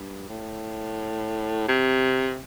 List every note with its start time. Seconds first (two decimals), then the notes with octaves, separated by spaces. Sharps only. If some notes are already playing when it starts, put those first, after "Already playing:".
Already playing: G2
0.29 A2
1.68 C3